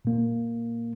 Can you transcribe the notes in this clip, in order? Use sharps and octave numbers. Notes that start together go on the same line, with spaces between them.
A#2 A#3